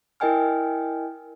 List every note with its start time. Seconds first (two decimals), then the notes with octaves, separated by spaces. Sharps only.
0.20 E4 A#4 D#5 G5 G#5 F6